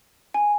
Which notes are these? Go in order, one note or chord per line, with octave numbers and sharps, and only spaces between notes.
G#5